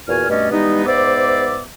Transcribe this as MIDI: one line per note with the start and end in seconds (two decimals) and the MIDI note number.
0.08 0.26 40
0.08 0.26 46
0.08 0.26 66
0.08 0.26 80
0.08 0.26 89
0.29 0.49 43
0.29 0.49 47
0.29 0.49 57
0.29 0.49 61
0.29 0.49 74
0.29 0.49 75
0.51 0.85 52
0.51 0.85 55
0.51 0.85 56
0.51 0.85 59
0.51 0.85 63
0.86 1.62 44
0.86 1.62 59
0.86 1.62 72
0.86 1.62 74
0.86 1.62 76
0.86 1.62 86